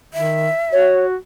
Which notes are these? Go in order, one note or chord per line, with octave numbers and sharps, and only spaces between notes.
D#3 E5
F#4 C#5